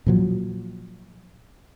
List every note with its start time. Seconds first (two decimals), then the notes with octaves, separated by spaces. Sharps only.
0.06 A#2 F3 F#3